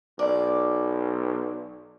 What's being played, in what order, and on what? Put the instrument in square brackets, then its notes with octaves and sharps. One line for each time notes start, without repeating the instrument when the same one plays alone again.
[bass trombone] B1 [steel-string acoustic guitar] D5